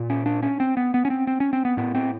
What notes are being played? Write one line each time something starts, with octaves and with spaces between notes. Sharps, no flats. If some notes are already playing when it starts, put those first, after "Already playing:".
Already playing: A#2
C#4
D4
C#4
C4
B3
B3
C#4
C4
C4
C#4
C4
B3
A2 B3
C4